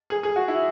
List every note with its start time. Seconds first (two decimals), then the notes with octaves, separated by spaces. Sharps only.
0.10 G#4
0.23 G#4
0.36 F#4
0.48 E4